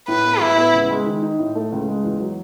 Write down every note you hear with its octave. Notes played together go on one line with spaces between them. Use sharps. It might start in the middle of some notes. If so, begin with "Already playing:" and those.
A2 B4
B3
A2 E4
B3
C#2
G#3
D#3
D#4
A2
A3
C#2
G#3
E2
F#3